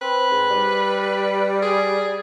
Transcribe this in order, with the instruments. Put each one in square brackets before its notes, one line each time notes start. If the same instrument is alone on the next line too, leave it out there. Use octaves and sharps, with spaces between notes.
[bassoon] C4 [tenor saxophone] B4
[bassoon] G#2
G3
[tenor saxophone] G#4